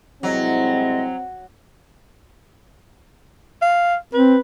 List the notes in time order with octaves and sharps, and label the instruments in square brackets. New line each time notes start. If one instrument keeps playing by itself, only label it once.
[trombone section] C2 G#3 E4 [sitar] F#3 [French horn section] C4 [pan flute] D#5
[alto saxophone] F5
[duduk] C4 [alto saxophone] B4